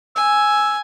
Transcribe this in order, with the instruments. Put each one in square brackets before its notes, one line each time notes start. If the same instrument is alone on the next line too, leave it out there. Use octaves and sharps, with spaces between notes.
[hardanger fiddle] G#5 [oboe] E6